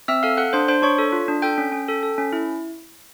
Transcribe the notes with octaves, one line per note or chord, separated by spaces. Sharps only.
C4 E5 E6
A4 F5 F6
A4 F#5 F#6
D4 C5 C6
D4 C5 C6
D4 C#5 C#6
A4
F4
D4
A4 G5 G6
C#4
C#4
A4
A4
C#4
E4